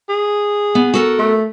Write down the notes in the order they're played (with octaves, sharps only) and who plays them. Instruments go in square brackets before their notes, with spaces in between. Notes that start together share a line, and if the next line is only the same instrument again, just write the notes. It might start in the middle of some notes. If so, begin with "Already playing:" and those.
[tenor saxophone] G#4
[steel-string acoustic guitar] B3
F#4 A4 A#4
[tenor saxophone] A3